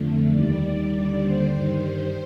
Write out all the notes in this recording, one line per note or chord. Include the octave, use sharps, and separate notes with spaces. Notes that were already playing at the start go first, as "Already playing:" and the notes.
Already playing: F2 D3 A3
D#2 D#3 G3 D5
D#2 D3 G3
C5
G2 D#3 G3
C5